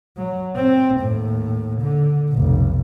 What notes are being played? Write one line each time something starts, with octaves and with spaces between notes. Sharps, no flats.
F#3
C4
D#2 A2
D3
F1 B1